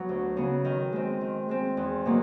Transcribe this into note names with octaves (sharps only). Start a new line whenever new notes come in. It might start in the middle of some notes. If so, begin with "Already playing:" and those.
Already playing: F#3 B3
D2
C#3 F#3 B3
D#3
G#3 C4
D#3
G#3 C4
E2
B2 F#3 A#3